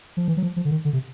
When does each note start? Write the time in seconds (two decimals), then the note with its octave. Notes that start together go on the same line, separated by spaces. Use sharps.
0.17 F3
0.28 E3
0.37 F#3
0.43 F3
0.56 F3
0.65 D3
0.71 D#3
0.85 D3
0.93 C3